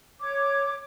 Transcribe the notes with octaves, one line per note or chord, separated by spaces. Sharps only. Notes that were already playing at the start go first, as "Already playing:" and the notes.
C#5 D6